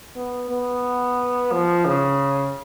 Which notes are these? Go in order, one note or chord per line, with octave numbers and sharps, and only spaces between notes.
B3
B3
F3
C#3